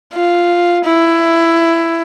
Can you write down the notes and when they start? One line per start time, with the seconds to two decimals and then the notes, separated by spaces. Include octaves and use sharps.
0.13 F4
0.85 E4